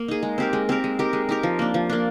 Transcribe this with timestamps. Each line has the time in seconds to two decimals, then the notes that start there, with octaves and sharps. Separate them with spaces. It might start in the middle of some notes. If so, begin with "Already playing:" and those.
Already playing: A#3
0.08 D#4 G#4
0.23 G#3
0.38 C4 G4 A#4
0.53 G#3
0.69 C4 G4 A#4
0.84 G#3
0.99 D#4 G4 A#4
1.13 G#3
1.29 D#4 G4 A#4
1.43 F3
1.59 A#3 D4
1.74 F3
1.89 A#3 D4